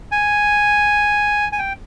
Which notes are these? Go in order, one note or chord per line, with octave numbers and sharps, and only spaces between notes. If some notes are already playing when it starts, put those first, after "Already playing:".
G#5
G#5
G5